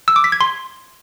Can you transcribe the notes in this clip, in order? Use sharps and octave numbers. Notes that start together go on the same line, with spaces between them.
E6
D6
B6
G#6
C6